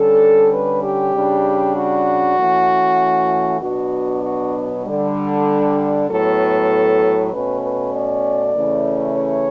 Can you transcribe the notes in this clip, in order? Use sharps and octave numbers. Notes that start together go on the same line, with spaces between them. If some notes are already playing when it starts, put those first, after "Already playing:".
Already playing: D3 G3 C#4 A4
B4
G4
C#3 G3 D4
F#4
E3 A3 C#4
B2 F#3 B3 D4 F#4
F#4
D3 G3 D4
A2 F#3 B3 A4
B2 A3 C#4 B4
B4
D5
C#3 E3 A3 C#4
C#5